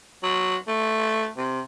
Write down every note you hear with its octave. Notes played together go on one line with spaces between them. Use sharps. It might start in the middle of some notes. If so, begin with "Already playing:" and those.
F#3
A3
C3